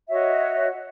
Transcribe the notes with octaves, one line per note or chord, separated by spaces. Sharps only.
F#4 C#5 D#5 E5